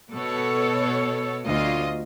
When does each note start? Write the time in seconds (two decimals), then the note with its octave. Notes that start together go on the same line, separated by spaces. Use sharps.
0.13 B2 A4 C#5
1.46 D2 F4 D#5